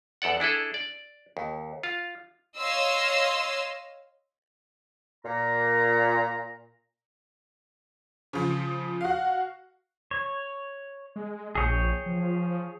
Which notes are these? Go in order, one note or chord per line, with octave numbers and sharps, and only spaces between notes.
E2 A4 D5 F#5
D4 E4 G#4 A4
D5
D#2
F4 F5
C#5 D#5 F5 C6 E6
A#2 A#5
C#3 F3
F#4 F5
C#5
G#3
A#1 G#4 C#5 G5
F3